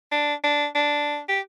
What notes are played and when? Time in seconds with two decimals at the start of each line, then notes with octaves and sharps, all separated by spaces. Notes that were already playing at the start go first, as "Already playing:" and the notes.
0.12 D4
0.44 D4
0.75 D4
1.28 G4